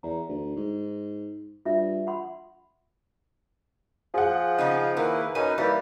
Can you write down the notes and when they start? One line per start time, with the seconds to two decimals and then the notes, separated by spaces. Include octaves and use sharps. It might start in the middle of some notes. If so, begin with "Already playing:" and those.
0.03 E2 A#5
0.29 D2
0.57 G#2
1.65 G2 F4 E5
2.07 F#5 B5 C6
4.14 F3 G#4 F#5
4.58 C#3 D#4
4.97 D#3 A#3 E4 B4
5.35 F#2 C#4 D#4 B4 G#5
5.58 E3 G3 A#3